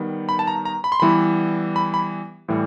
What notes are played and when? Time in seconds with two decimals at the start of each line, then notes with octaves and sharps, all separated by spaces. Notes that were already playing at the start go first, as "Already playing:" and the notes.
Already playing: D#3 G3 B3
0.29 B5
0.39 A5
0.47 A#5
0.65 A#5
0.84 B5
0.92 C6
1.00 E3 G3 B3 E4 B5
1.76 B5
1.94 B5
2.48 A2 E3 G3